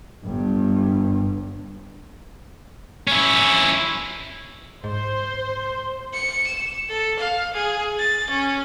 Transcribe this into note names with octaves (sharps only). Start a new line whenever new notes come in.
G1 G2
C#4 E4
G#2 C5
C#7
E7
A4
F5
G#4
A6
C#4